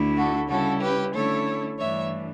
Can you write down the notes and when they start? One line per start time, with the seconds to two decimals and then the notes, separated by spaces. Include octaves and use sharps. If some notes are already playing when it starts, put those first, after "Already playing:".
Already playing: D2 D3 A3 E4
0.17 F#4 A4
0.49 C#3 G3 C#4 E4 F#4 A4
0.81 G4 B4
1.14 D3 A3 C#4 E4 A4 C#5
1.78 G2 E3 A3 D4 C#5 E5